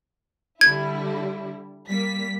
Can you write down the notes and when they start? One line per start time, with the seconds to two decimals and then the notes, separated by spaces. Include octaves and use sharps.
0.61 D3 G3 E4 G#6
1.90 G3 A#3 B6